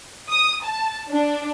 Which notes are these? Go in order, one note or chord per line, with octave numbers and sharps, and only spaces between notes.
D#6
A5
D4